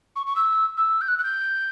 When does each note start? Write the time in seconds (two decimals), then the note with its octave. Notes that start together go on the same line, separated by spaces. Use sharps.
0.16 C#6
0.26 C#6
0.36 E6
0.77 E6
1.01 G6
1.08 F#6
1.18 F#6
1.23 G6